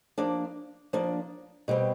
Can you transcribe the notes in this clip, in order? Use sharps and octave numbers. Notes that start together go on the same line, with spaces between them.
F3 A#3 D4
F3 A#3 D4
B2 G3 C4